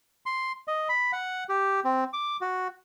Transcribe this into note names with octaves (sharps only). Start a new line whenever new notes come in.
C6
D#5
B5
F#5
G4
C4
D6
F#4